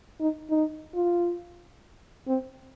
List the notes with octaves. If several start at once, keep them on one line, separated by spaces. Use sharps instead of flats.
D#4
D#4
F4
C4